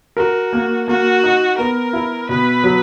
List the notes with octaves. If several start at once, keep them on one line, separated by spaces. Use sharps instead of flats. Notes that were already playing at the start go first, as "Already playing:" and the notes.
F#4 A#4
A#3
A#3 F#4
D#4
B3 A#4
E4
B2 B4
F#3